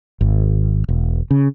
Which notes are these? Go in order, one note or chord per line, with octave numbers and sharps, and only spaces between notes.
G#1
E1
C#3